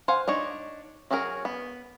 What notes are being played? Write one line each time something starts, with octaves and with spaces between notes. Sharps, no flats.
C5 F5 F#5 G#5
D4 D#4 C#5
F#3 C#4 F#4 G#4 A#4
B3